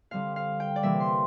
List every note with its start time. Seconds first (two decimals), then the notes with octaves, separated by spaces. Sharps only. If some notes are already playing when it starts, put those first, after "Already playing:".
0.11 D3 G3 C4 F5
0.36 F5
0.60 G5
0.76 D5
0.83 C3 E3 G3 A#3 E5
1.00 C6